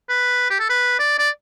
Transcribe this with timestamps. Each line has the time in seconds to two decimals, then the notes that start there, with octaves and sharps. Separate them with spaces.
0.09 B4
0.50 G4
0.59 A4
0.70 B4
0.99 D5
1.19 D5